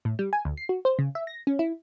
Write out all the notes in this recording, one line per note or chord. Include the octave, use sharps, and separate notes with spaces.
A2
G3
G#5
D2
C7
F#4
C5
C#3
E5
A#6
C#4
E4